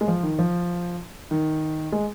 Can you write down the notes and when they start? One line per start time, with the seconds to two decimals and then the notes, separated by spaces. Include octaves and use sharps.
0.01 G#3
0.08 F3
0.23 D#3
0.39 F3
1.31 D#3
1.92 G#3